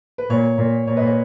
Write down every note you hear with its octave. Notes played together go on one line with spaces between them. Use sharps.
B4
A#2 C#5
A#2
A#2 C#5
B4 D#5
C#5